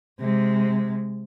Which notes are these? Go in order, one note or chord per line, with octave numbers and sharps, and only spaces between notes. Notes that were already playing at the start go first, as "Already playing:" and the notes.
C3 G#3